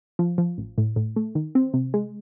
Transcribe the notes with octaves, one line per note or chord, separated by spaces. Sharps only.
F3
F3
A1
A2
A2
A3
D#3
C4
C3
G#3